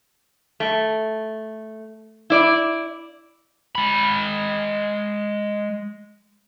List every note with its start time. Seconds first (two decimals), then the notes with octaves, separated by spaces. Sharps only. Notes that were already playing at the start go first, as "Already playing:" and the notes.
0.60 A3
2.30 E4 D5
3.75 G#3 B5